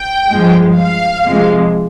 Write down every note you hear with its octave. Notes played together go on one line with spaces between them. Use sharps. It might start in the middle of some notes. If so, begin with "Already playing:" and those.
Already playing: G5
G2 F3 G#3
F5
C3 F3 G#3